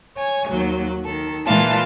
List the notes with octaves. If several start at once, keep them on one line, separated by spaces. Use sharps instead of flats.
C#5 G#5
D#2 F#3
D#3 A4
A#2 E3 G#3 F4 F5 A5